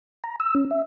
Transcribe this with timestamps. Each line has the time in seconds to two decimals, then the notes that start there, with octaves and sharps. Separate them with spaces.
0.24 A#5
0.40 E6
0.55 C#4
0.71 E5